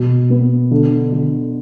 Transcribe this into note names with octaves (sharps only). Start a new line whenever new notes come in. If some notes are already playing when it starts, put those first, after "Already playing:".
Already playing: B2
B3
D3
D3